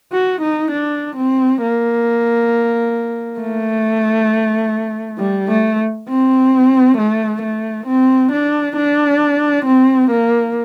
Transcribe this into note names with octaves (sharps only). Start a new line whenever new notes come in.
F#4
D#4
D4
C4
A#3
A3
G3
A3
C4
A3
A3
C4
D4
D4
C4
A#3